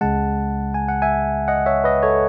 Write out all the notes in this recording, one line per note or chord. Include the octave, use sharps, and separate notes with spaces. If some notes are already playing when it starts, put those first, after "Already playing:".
C#2 C#3 G#3 F#5 A5
G#5
F#5
E5 G#5
D#5 F#5
C#5 E5
B4 D#5
A4 C#5